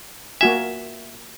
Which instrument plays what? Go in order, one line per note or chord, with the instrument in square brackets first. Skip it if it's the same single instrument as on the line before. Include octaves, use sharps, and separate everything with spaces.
[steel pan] A#3 F#4 G#5 [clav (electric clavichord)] E5